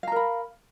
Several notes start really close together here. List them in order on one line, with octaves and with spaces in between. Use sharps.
F5 A#5 A#4 B5